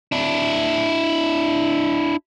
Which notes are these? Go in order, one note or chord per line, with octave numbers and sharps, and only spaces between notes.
D4 E4